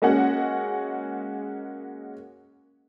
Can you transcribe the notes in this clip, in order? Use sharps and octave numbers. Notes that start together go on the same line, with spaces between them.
G#3 A#3 C#4 F#4 F#5